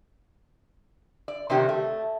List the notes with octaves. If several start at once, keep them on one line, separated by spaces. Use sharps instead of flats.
D5
C3 D#3 F#3 G4
A3